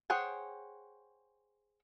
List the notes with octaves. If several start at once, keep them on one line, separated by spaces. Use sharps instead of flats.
G#4 C5 C#5 F#5 G5